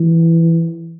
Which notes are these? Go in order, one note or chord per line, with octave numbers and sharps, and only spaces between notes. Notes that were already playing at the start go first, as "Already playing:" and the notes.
Already playing: E3